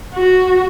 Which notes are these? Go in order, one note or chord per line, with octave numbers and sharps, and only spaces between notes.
F#4